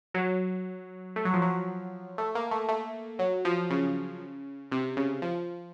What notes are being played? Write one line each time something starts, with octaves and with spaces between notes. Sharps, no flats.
F#3
A3
F#3
F3
F#3
A3
A#3
A3
A3
F#3
F3
C#3
C3
C#3
F3